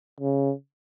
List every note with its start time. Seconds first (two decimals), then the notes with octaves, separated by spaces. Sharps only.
0.21 C#3